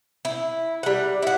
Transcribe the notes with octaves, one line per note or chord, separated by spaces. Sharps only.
E4
G3 F#5
E4 F#5